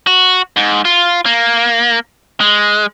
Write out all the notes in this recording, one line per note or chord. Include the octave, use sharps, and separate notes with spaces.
F#4
G#2
F4
A#3
G#3